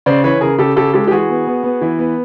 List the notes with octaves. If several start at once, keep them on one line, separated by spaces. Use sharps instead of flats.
C#3 C5 D5
E3 B4 C#5
C#3 G#4 A#4
C#3 G4 A4
C#3 G4 A4
G#3 G4 A4
G4
E3 F#4 G#4
B3
B3
B3
E3
B3